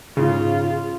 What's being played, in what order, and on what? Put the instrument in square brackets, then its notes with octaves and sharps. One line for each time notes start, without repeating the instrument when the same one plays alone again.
[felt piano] G#2 [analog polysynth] C#3 [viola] F4